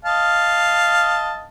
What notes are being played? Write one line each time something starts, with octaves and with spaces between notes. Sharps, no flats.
D#5 F5 A5